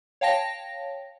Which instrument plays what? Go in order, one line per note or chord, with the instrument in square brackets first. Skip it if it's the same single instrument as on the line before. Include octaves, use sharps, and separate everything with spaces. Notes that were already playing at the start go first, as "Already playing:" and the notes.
[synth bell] C#5 F5 G5 A5 A#6